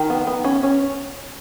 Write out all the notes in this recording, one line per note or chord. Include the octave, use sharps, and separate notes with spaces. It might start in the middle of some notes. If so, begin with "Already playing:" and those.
Already playing: D#3
B3
B3
C#4
C#4